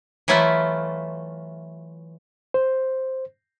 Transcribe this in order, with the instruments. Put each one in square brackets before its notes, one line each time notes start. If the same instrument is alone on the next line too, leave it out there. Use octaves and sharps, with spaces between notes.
[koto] E3 F#3 A3 E4 F4
[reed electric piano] C5